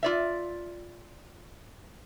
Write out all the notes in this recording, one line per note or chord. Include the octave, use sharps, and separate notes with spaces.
F4 D5 E5